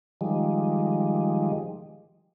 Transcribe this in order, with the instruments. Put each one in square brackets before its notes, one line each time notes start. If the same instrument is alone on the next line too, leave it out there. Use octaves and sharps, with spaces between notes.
[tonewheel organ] D#3 F3 G3 G#3